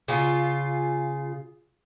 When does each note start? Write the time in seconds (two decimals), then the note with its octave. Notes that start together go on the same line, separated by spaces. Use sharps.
0.08 C#3 F4